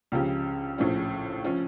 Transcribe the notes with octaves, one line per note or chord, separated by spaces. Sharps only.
C#2 C#3 F3 C#4 G4
A#1 A2 F3 C#4
F3 C#4